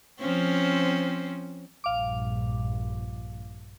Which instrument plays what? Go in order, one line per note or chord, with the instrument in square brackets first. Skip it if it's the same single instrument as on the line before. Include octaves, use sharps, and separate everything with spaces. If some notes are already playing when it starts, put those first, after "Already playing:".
[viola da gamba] F3 C4 C#4
[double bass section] A#1 G2 [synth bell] F5 D6